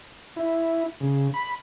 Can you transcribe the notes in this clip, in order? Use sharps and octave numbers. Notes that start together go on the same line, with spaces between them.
E4
C#3
B5